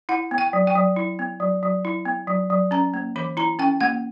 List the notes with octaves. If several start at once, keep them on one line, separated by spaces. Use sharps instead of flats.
E4 F#5
B3
G5
F#3
G5
F#3
E4
B3
F#3
F#3
E4
B3
F#3
F#3
C#4 A#5
A#3
E3 B5
E4 A#5
C#4 G5
A#3 F#5